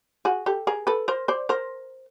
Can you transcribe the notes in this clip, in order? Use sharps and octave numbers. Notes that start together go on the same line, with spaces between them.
F#4 G#4
G4 A4
G#4 A#4
A4 B4
A#4 C5
C5 D5
A#4 C5